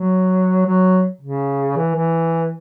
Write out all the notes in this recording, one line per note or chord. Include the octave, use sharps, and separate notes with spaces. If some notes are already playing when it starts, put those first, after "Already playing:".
Already playing: F#3
F#3
C#3
E3
E3